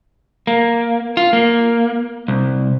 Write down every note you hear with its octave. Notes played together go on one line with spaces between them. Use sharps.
A#3
F4
A#3
C2